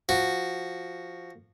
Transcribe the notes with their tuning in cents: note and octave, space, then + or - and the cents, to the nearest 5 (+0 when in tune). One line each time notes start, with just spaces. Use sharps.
F3 +0 F#4 +0